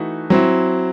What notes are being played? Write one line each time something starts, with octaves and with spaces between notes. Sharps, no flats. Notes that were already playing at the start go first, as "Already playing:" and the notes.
Already playing: E3 A3 D#4 F#4
F#3 C4 E4